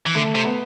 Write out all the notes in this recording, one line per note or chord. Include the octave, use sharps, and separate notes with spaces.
E3
D3 A3
C3
B3